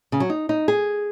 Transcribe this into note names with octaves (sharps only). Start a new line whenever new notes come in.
C#3
F#3
D#4
D#4
G#4